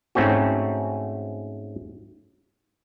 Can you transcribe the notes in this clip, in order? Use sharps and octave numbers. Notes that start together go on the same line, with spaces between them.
G#2 A3 C4 C#4 F#4